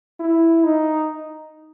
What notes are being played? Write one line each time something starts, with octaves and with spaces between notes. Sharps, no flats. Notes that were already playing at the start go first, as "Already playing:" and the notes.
E4
D#4